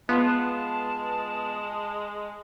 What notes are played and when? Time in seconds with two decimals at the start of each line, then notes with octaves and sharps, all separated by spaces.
0.09 G#3 B3 F4 A5